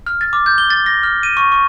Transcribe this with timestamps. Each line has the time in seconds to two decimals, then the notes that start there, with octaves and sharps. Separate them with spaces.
0.06 F6
0.21 A6
0.33 D6
0.46 G6
0.58 G7
0.70 A6
0.86 A#6
1.03 F6
1.23 D#7
1.37 C#6
1.52 C#6